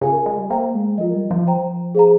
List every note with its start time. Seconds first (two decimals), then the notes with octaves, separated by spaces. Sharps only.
0.01 C#3 F4 A#4 F5 G#5
0.26 G#3
0.38 G3
0.50 A#3 C5 G5 A#5
0.74 G#3
0.98 F3 F4 A#4 D#5
1.14 G3
1.31 F3
1.47 C5 G5 A#5
1.95 G#4 C5 F5 A#5